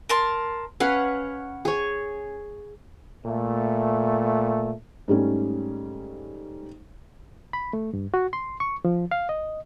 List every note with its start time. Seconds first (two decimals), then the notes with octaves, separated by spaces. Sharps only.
0.09 A#4 A5 C6
0.80 C#4 B4 F5 F#5
1.65 G#4 C#5
3.26 A#2 A3
5.08 G#2 G3 A3 C#4
7.53 B5
7.73 A3
7.93 G2
8.14 F#4
8.33 C6
8.60 C#6
8.85 F3
9.11 F5
9.29 D#5